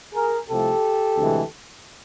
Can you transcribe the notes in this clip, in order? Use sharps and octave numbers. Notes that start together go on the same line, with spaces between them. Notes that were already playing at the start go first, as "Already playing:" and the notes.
G#4 A#4
C2 C3 F3 A3 G4 A4
D2 C3 E3 G#3